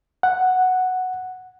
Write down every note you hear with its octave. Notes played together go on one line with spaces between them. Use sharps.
F#5